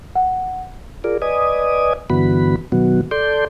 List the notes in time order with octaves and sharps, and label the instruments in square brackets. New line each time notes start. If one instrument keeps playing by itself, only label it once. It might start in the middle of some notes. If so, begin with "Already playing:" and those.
[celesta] F#5
[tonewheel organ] F4 G#4 A#4 D5
B4 D5 D#5 G#5 D#6
G2 D3 E3 B3 F#4 B5
B2 D#3 F#3 B3 F#4
A4 D5 C6 G6